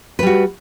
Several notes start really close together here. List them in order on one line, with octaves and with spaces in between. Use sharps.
B4 G3 F#4